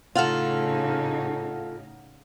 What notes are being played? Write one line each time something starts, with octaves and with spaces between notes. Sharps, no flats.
A2 C#3 D#4 F4 A4 F5 F#5 F6